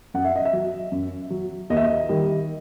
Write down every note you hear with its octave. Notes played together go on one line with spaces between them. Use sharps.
F#2 F#5
E5
D#5
E5
F#3
F#2
F#3
D#2 D#5
E5
D#5
D#3 G3